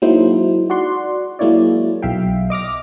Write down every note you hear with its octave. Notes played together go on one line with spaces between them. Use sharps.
F#3 G#3 A#3 D#4 E4 C5
F#4 D5 F#5 C6
F#3 G#3 A#3 E4 C#5 D5
B1 E5 F5 G5
D#5 D6 F6 A#6